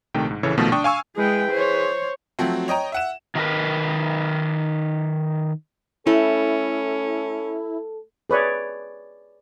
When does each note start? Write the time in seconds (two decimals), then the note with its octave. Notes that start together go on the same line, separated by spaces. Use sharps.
0.14 A#1 C3 D#3 A3 G5
0.31 G#2
0.43 A#1 C#3 E3 A4 C#5
0.57 A#1 B2 D#3 F3 A3
0.72 D4 G5 C#6 D#6
0.84 F5 G#5 C#6 E6
1.17 G#3 E4 G#4 B4 G5
1.51 C5 C#5
2.39 F3 F#3 A3 C4
2.68 C#5 D#5 G5 A#5
2.92 E5 F#5 E7
3.35 D#3 D#4 F4 G#4 A#4 B4
6.07 A3 C#4 E4 A4
8.30 G#4 B4 C#5 D5